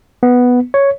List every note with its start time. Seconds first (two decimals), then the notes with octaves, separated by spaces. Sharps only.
0.23 B3
0.74 C#5